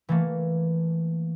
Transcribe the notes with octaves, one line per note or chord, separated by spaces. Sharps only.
E3 A3 A#3